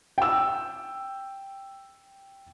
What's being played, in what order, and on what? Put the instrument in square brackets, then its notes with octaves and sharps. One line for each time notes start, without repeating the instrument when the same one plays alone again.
[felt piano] G5 E6